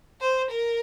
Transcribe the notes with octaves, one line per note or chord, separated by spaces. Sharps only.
C5
A#4